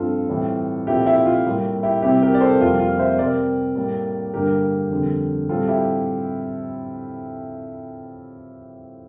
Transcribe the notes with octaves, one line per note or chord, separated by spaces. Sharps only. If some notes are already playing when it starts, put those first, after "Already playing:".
Already playing: G2 F3 C4 F4 A4
A2 E3 G3 C4
A#2 F3 A3 C4 E4 G4
E4
F4
A2 G3 A#3
E4 G4
C3 G3 C4 E4 G4
G4 A#4
D5
A4 C5
F2 C3 G3 A#3 F4
F4
C5 E5
C3 G3 C4 A#4 D5
A2 G3 A#3
G2 D3 G3 A#3 G4 A#4
F2 D3 G3
A2 G3 C4 F4 A4
E4 G4